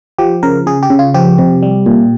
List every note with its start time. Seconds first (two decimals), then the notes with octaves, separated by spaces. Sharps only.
0.18 F3 G4
0.43 C#3 A#4
0.66 C#3 G#4
0.83 G4
0.90 C#3
0.99 F4
1.14 F3 G4
1.38 C3
1.63 G3
1.86 A#2